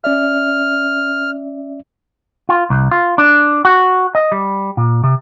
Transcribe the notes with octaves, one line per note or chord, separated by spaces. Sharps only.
C#4 D5 E5 F6
F4
C2
F4
D4
F#4
D#5
G3
A#2
C3